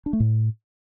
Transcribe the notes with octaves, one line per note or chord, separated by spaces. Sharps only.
D4
A3
A2